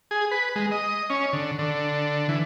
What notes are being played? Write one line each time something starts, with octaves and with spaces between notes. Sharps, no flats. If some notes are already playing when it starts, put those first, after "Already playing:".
G#4
B4
G#3
D#5
C#4
D3
D3
E3